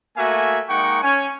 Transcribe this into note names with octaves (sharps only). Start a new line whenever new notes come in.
A3 A#3 F#4 E5 G#5
G#3 A#3 D#4 F#5 G5 C#6
C#4 C#5 G#5